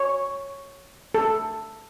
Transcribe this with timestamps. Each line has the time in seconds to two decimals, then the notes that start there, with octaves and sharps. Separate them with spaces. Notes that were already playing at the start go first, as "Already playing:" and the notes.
Already playing: C#5
1.15 A4